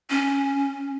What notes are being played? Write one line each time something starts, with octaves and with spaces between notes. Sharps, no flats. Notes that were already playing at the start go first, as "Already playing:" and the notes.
C#4